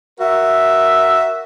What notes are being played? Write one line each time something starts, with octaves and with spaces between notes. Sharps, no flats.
F#4 A#4 E5